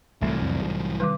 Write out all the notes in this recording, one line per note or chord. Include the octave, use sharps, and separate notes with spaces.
C2 A2 E3 F#3 A3
F2
C3
D#3 G3 D6